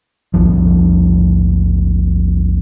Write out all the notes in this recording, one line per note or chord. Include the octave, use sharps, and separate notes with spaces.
A#1 E2 F3